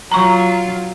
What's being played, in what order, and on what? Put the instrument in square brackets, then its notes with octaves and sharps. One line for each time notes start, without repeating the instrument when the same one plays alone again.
[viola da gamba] F#3 F4 [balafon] A#5 C#6